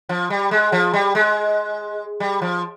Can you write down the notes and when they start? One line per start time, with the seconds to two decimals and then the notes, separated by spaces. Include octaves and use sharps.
0.09 F3
0.30 G3
0.51 G#3
0.72 F3
0.94 G3
1.15 G#3
2.20 G3
2.42 F3